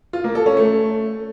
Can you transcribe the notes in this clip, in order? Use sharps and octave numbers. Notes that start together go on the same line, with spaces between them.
F4
A#3
A4
C#4
A3